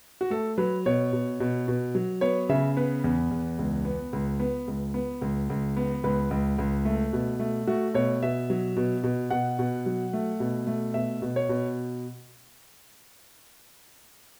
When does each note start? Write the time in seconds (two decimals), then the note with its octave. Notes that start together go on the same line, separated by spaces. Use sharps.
0.21 F#4
0.30 A3 A4
0.58 F#3 B4
0.86 B2 C#5
1.13 B2
1.40 B2
1.68 B2
1.95 F#3
2.21 B3 C#5
2.49 C#3 E5
2.77 B3 B4
3.04 E2
3.31 E2
3.59 C#2
3.85 B3
4.13 C#2
4.40 B3
4.68 C#2
4.94 B3
5.21 C#2
5.50 C#2
5.77 B3
6.04 C#2 B4
6.31 C#2
6.58 C#2
6.85 A3
7.13 B2
7.40 A3
7.67 A3 F#4
7.94 B2 C#5
8.23 B2 E5
8.50 F#3
8.77 B2
9.04 B2
9.30 B2 F#5
9.59 B2
9.86 F#3
10.13 A3
10.40 B2
10.67 A3
10.94 B2 E5
11.22 B2
11.36 C#5
11.49 B2